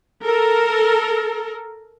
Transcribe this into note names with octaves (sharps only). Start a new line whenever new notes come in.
A4 A#4